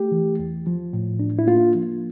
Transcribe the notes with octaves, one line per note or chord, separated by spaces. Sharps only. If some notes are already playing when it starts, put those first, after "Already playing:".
Already playing: A3 G4
E3
E2
F3
A2
D4
E4
A#3 F4
F3